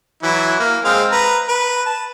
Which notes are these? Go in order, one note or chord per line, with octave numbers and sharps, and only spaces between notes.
E3 F#3 E4
A#3
G#3 C4 F5
B4 A#5
B4
A5